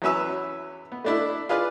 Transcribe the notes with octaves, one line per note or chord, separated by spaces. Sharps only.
E2 F#3 C#4 B4 E5
B3
A3 D4 E4
F4 G#4 B4 D5